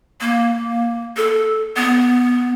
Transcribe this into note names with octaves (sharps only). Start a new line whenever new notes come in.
A#3
A4
B3